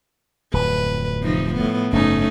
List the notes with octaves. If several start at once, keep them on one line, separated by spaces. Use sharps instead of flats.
D1 F2 B4
C3 F3 D#4
A2 B3
F#1 G#2 A3 C#4 D#4